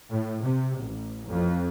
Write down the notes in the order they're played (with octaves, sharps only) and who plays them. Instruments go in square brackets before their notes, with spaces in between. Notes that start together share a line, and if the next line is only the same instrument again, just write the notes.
[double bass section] A2
C3
A1
F2